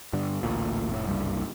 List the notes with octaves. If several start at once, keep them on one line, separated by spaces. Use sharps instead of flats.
G2 D3
A1 D2 A#2
F1 A2
F#1 C2 G2